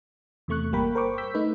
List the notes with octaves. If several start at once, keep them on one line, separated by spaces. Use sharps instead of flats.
E2 C3 A3 C#6 F#6
G1 G3 A#3 A#4 G5 B5
A#4 C5 G5 C#6 D6
E6 G6 B6
A3 D#4 B4